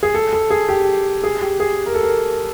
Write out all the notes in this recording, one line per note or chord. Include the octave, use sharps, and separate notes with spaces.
G#4
A4
A4
G#4
G4
G#4
G4
G#4
A#4
A4
A#4